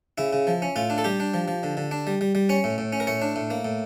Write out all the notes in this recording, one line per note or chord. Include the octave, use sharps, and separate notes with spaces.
C#3 E4
C#3
F3
C#4
A2 F4
D4
A4
G3 G4
D4
F3
F3
D3
D3
D4
G3
G3
G3
C#4 C#5
A2
A2
C#4
A#4
A2 C#5
D4
A2
A#3
A2